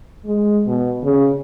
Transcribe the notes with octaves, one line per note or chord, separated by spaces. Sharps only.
G#3
B2
C#3